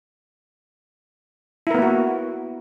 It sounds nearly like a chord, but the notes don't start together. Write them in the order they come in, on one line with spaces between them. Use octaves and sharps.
E4 A#4 B3 A#3 F#4